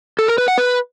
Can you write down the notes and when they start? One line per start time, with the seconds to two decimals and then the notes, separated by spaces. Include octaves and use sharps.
0.19 A4
0.28 A#4
0.38 B4
0.48 F#5
0.58 B4